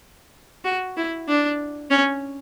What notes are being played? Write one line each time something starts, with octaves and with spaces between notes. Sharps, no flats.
F#4
E4
D4
C#4